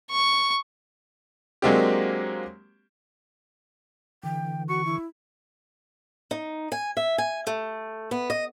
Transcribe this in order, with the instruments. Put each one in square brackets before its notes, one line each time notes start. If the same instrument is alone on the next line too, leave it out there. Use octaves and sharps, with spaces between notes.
[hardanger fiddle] C#6
[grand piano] F#3 G#3 A#3 C4 D4 G4
[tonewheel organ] D3 E3 [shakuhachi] G5
[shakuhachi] F#4 [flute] C#6
[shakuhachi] E4
[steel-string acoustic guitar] D#4
G#5
E5
G#5
A3
B3
D#5